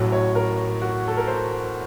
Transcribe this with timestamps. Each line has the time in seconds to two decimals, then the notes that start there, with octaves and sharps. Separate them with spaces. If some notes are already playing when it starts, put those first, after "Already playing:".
Already playing: A1 A2 F#3
0.12 C#5
0.35 A#4
0.82 F#4
1.08 A4
1.17 A#4
1.27 C5